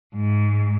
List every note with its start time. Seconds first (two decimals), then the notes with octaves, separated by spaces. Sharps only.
0.15 G#2